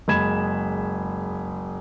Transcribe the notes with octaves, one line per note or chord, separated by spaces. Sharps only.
F#1 G#3 B5 G#6 E7